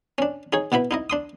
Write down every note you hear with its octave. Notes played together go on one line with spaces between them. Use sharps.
C#4 D4
D#4 G#4 C#5
B2 B3 E4 B5
D#4 E4 D#5
D4 C6 D#6